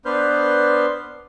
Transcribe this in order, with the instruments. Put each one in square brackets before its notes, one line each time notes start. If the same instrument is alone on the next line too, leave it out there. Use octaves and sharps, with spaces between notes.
[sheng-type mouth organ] B3 D4 B4 C5 F6 G6